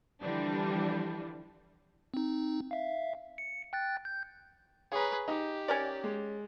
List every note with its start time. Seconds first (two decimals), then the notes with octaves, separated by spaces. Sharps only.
0.21 D3 E3 F3 G3 D4
2.14 C4 D#4
2.71 E5 F5
3.38 C#7
3.73 G5 F#6 A6
4.05 G6
4.92 G#4 B4 C#5 A#5
5.28 D#4 G4
5.68 C#4 A#4 D5
6.04 G#3